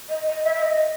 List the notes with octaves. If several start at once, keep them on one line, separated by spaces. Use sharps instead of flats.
D#5
D#5
E5
E5
D#5